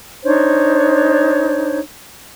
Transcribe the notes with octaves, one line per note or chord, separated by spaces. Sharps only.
D4 D#4 C5 C#5